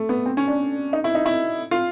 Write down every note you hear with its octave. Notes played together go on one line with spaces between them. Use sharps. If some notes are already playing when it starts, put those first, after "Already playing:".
Already playing: A3
B3
C4
C#4
D4
D#4
E4
D#4
E4
F4